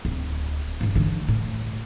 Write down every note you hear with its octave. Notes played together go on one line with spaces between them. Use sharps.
D1
A1 G2
D3 E3
A2